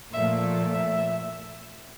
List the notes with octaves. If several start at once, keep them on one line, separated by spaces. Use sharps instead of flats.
A#2 F3 A3 E5
E5